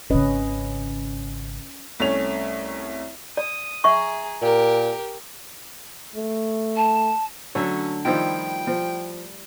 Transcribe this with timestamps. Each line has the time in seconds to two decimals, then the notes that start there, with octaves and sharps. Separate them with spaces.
0.10 G#1 C#3 C#4 B4 D#5
2.00 C2 A3 C#4 C#5 F7
3.37 D5 D#6
3.84 G#4 E5 A#5 C#6
4.42 A#2 G4 A#4
6.16 A3
6.76 A5
7.55 D3 F#3 A3 C#4 E5
8.05 D#3 F3 G3 E4 F4 G5
8.67 F3